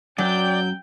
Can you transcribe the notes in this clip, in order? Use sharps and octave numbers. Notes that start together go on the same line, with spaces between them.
F#2 F#3 D5 G5 G6